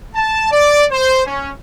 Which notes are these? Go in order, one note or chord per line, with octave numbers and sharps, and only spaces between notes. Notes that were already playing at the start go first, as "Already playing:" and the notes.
A5
D5
C5
C#4